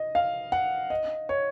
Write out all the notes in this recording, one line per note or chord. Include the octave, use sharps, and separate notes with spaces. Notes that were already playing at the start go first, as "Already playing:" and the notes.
Already playing: D#5
F5
F#5
D#5
C#5